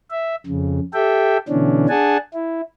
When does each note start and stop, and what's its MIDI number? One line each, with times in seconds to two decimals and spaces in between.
0.11 0.35 76
0.47 0.80 41
0.47 0.80 49
0.94 1.37 67
0.94 1.37 69
0.94 1.37 76
0.94 1.37 79
1.48 1.87 47
1.48 1.87 50
1.48 1.87 52
1.48 1.87 61
1.48 1.87 62
1.89 2.17 62
1.89 2.17 68
1.89 2.17 78
1.89 2.17 80
1.89 2.17 81
2.33 2.61 64